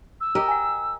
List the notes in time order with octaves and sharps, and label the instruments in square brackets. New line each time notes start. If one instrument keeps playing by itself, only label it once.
[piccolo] E6
[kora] G4 A#4 D#5
[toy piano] F#5 G#5